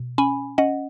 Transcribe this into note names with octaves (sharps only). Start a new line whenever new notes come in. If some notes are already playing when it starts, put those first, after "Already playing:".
Already playing: B2
C#4 G#5 B5
C#4 D#5 F#5